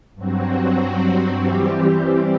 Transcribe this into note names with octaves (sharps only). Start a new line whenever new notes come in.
G2 F#3 C4 F#4
E3 G3 C4 G4